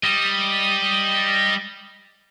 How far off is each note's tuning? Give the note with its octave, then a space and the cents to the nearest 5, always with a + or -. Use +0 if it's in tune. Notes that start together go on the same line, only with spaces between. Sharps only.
G3 +0 D#5 +0